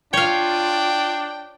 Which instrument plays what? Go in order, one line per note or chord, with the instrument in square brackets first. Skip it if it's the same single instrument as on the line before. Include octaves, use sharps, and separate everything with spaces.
[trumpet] D4 [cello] F4 [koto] C#5 F5 [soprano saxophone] G5